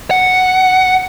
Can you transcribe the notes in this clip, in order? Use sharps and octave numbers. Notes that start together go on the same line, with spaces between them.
F#5